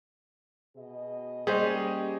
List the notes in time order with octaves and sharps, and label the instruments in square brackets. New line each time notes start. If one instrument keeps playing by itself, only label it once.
[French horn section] B2 G#4 D#5
[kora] G3 C#4 C5 [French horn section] A#3 G4 [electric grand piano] G#4 D#5